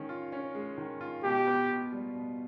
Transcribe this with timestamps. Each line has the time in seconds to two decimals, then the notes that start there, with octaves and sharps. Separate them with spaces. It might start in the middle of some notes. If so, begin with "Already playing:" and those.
Already playing: D#3 G#3 C#4
0.09 F4
0.32 C#4
0.55 G#3
0.78 D#3
1.01 F4
1.24 B2 G4
1.47 B3
1.70 B2
1.93 G3
2.16 B2